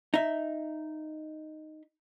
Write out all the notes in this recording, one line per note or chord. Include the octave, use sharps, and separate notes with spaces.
D#4 E5